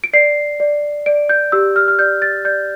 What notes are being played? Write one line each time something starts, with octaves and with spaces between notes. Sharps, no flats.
D7
D5 C7
D5
D5 D7
G6
G4 E6
F6
F6
D5 G6
A6
D5 G6